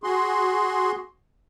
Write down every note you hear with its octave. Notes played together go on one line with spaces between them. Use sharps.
F#4 G#4 C6